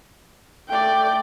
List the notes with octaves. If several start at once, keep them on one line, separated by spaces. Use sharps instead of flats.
A3 D5 G5